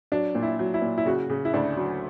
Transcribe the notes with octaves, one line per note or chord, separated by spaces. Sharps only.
F#3 D4
A#2
E4
F#3
E4
A#2
E4
C#3 F#4
C#3
E4
D2 D4
F#3